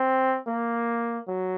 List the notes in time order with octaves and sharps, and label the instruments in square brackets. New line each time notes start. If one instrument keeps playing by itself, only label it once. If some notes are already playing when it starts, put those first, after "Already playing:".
Already playing: [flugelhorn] C4
A#3
F#3